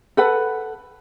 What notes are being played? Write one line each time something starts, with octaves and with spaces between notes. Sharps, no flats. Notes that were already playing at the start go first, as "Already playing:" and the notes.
A4 B4 F#5